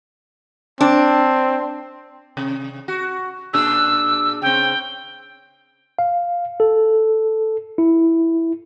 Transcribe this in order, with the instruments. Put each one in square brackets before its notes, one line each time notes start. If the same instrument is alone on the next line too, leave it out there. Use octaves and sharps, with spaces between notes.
[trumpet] C4 [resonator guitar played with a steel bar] D4
[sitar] C3
F#4
[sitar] A#2 D4 G#4 [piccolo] E6
[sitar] C#3 C4 [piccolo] G5
[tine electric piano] F5
A4
E4